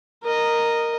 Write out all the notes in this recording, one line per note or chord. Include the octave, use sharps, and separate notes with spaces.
A#4 D#5